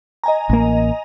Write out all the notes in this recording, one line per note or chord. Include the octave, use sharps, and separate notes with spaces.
D#5 G#5 A#5
A1 A#3